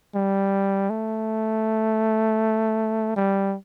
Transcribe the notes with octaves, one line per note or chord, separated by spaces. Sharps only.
G3
A3
G3